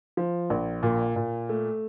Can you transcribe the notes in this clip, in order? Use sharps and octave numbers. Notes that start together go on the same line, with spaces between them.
F3
A#1
A#2
A#2
A3